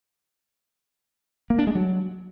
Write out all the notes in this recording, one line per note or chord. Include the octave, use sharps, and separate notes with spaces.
A#3
D4
G#3
F#3